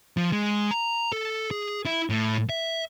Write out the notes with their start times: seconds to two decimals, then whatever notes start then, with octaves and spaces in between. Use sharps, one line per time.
0.17 F3
0.32 G#3
0.71 A#5
1.12 A4
1.51 G#4
1.85 E4
2.10 A2
2.49 E5